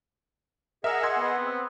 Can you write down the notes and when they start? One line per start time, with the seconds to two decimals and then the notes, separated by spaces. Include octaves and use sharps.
0.84 G#4 A#4 D#5 E5 F#5 E6
1.03 C6 E6 G#6
1.19 B3
1.39 C4